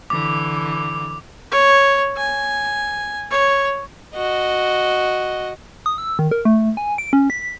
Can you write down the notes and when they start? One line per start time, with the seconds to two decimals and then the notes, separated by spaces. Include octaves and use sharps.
0.10 D3 E3 D6
1.51 C#5
2.17 G#5
3.31 C#5
4.15 F#4 D#5
5.86 D#6
5.98 E6
6.19 D#3
6.31 A#4
6.45 A3
6.77 G#5
6.98 D7
7.13 C#4
7.30 B6